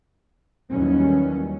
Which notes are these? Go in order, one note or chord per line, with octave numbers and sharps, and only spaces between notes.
D#2 D#3 E3 F#3 G3 C#4